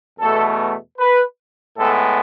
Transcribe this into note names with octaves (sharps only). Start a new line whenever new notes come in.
E2 B2 A3 A4
B4
A2 G#3 B3 A4